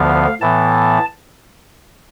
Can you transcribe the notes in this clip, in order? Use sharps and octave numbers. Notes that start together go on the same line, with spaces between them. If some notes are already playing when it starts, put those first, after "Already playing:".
Already playing: D2 D3 F3 B3 F5
A2 E3 B3 A5